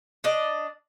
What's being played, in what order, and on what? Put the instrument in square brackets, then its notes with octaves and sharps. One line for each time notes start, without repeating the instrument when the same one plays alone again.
[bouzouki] D4 D5 D#5